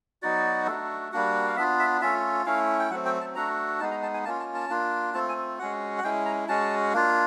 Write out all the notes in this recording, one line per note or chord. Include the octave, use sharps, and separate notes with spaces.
F#3 B3 D#4 F#4 D5
A3 D4 F#4
G3 A#3 D4 F#4
F5
B3 D4 F4 E5
E5
A3 C#4 F4 E5
A3 C#4 E4 F5
G5
F#3 A3 C4 F#5
G5
A5
A3 D4 F#4 A#5
G#3 B3 D#4 A5
A#5
A5
G#5
A#3 C#4 F4 A5
A5
A5
A#3 D4 F4
A3 C4 F4 A5
G#5
G#3 C#4 F#4 F#5
F#5
G#3 C#4 E4 G5
A#5
G#3 C#4 F#4 A5
A#3 D4 F4